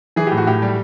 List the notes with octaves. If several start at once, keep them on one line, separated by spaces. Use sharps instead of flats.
E3 G#4
A2 G4
F#4
A2 G4
G3